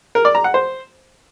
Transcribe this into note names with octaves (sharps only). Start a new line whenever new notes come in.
A#4
D5
A#5
F#5
C5